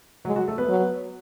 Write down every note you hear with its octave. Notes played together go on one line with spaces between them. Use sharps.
F#3 G#3 F#4
F#3 F#4
A3 A4
B3 B4
F#3